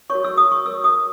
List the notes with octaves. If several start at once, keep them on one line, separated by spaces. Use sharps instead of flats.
F#4 A#4 C#5 C#6
E6
D#6
C#6
F#4 A#4 C#5 E6
D#6